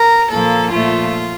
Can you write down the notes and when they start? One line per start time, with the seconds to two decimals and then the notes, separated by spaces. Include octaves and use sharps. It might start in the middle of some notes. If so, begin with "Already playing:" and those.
Already playing: A#4
0.32 A#2 F3 A#3 A4
0.72 A#2 F3 A3 F4